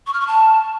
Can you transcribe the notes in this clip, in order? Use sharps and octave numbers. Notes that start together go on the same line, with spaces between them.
C#6
F6
C#6
A5